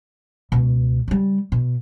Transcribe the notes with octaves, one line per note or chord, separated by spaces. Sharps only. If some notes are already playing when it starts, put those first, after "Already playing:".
C#2 B2
C#3 G3
B2